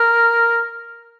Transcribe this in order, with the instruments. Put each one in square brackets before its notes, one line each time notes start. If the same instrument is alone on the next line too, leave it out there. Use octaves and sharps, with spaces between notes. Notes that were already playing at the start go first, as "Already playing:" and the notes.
Already playing: [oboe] A#4